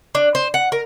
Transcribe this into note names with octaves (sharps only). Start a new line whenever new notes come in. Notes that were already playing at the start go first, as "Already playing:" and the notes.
D4
C5
F#5
A#4